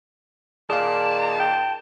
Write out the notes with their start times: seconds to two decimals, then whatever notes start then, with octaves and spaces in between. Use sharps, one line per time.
0.70 A#2 D#3 G#4 D5 F5 A5
1.40 G5